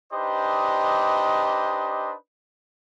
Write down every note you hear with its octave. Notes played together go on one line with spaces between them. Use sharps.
D4 D#4 G4 B4 C5 D#5